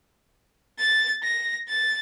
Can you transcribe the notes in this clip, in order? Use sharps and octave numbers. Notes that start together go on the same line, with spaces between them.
A6
A#6
A6